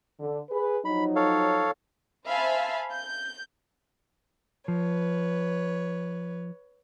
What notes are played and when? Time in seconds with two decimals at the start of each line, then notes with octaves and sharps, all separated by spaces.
0.20 D3
0.50 G#4 B4
0.85 F3 F#3 D#4 B5
1.16 A4 C#5 F5
2.26 C5 E5 F5 G#5 A5 B5
2.93 G6
4.68 F3 B4 C#5